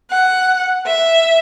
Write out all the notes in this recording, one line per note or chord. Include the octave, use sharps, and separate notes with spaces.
F#5
E5